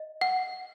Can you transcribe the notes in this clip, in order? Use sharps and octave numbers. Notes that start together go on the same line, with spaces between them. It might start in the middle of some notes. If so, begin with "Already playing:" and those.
Already playing: D#5
F#5